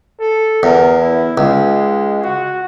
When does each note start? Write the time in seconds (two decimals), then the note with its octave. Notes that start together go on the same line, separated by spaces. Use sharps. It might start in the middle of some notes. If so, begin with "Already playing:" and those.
0.21 A4
0.63 E2 A#4
0.99 E4
1.38 C#2 G#3
2.23 F#4